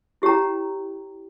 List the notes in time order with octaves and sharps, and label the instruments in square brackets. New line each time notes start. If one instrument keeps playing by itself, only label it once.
[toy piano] E4 G4 C#5 G5 A#5